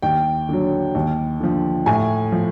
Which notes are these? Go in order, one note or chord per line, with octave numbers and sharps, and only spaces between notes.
D#2 G5
D3 F#3
D#2
D3 F3
A2 G#5
F3